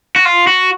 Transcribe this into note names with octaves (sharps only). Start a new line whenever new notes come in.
F#4
F4
F#4